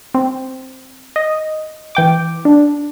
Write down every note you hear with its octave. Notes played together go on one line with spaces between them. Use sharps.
C4
D#5
E3 G5 D6
D4